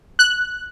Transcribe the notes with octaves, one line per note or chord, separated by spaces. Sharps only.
F#6